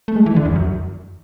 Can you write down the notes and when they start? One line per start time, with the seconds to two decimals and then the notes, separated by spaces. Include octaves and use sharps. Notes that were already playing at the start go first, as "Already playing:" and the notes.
0.08 A3
0.16 G#3
0.26 E3
0.36 D3
0.45 E2
0.56 F#2